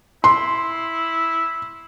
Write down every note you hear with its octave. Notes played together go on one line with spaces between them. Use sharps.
E4 C6